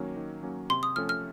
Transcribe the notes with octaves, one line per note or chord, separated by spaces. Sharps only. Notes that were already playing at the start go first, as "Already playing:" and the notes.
Already playing: D#3 F#3 A#3 C#4
D#3
F#3 A#3 C#4
C3 C6
D#6
F3 A3 C#4 A4 F6
F6